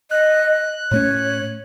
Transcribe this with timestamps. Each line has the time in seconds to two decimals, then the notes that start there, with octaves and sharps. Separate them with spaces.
0.11 D#5 F#6
0.91 A2 A3 C#4 C#5